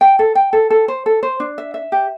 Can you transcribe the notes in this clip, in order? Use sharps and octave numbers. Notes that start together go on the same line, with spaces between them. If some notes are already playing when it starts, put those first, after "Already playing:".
G5
A4
G5
A4
A4
C5
A4
C5
D4
E5
E5
G4